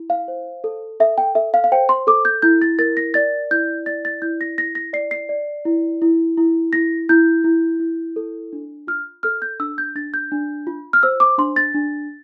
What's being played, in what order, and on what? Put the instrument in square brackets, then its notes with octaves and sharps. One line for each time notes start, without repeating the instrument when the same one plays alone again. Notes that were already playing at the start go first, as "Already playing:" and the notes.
Already playing: [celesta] E4
F5
C5
A4
A4 E5
G5
A4 E5
F5
F5
C5 G5
C6
A4 D6
G6
E4 G6
A6
A#4 A6
A#6
D5 A6
E4 G6
D5 A6
A6
E4 G6
A#6
E4 A#6
A#6
D5 C7
C7
D5
E4
E4
E4
E4 A#6
E4 G6
E4
E4
A4
D4
F4 F6
A4 F6
G6
D4 E6
G6
D4 A6
G6
D4
F4
F6
C5 E6
D6
D4 C6
A6
D4